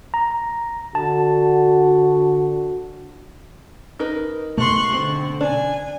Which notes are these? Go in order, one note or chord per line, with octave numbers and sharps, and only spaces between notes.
A#5
D3 F#4 A5
D#4 A#4 B4
B2 A3 C6 C#6 F#6
D3 C4
D4 G#5